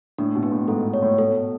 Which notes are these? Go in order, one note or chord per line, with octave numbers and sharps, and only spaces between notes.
A2 D4
B2
B3
A2
G#2 A4
G#2
C#5
A2
B2 A4